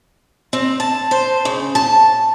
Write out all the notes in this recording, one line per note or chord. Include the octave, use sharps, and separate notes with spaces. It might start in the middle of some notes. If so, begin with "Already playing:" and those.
C4
A5
C5
C#3
A5